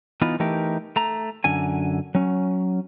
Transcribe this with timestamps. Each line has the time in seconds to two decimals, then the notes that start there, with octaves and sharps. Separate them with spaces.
0.22 E3 B3 D#4 F4
0.40 E3 A3 D#4 G4 A#4
0.96 A3 A#5
1.44 F#2 D3 G#5
2.15 F#3 C#4